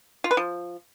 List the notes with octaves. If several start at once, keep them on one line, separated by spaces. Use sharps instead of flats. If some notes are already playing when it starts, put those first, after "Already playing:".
F4
B4
F3